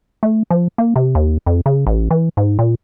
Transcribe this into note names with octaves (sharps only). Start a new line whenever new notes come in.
A3
F3
A#3
C3
D#2
F2
C#3
A1
E3
G#2
A#2